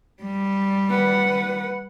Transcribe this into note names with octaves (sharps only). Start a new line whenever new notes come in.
G3
B4 F#5